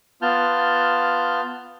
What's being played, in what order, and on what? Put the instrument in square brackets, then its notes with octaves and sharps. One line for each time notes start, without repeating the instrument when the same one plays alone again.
[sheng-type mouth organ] B3 F4 A5 F6 G6